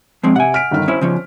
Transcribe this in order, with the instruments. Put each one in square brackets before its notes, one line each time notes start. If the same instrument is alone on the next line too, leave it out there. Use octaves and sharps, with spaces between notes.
[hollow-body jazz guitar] F3 G#3 C4
[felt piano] C3 [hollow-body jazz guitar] F#5 G#5
[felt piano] F6 B6 D7
G1 D#3 F6
[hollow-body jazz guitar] C#4 E4 [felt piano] C5
[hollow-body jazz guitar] C#3 F3 C#4